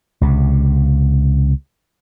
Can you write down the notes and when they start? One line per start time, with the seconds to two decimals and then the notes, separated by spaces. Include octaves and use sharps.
0.21 C#2 C3